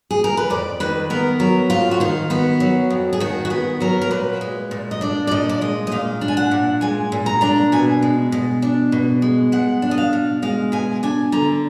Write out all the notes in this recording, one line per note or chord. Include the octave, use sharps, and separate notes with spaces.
G#4
A#4
B4
F2 D5
D#3 B4
B3 A#4
F#3 A#4
F2 F4
F#4
D#3 F4
B3 F#4
F#3
F2
G#4
D#3 F#4
F#4
B3 G#4
F#3 A#4
A#4
A#2 B4
G#3
A#2
D#5
D4 D5
D5
A#2 D#5
D5
G#3 D#5
D#5
A#2 F5
D4
G#5
F#5
A#2
G#3 G#5
A#2
A#5
D4 A#5
B2 G#5
G#3
B2
D4
B2
G#3
B2 F#5
D4
D#5
F5
B2
G#3 F5
B2 G#5
D4 G#5
D3 A#5